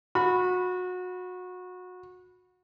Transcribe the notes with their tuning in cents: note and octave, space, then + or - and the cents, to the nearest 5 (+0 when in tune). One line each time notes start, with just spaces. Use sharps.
F#4 -25 B5 +0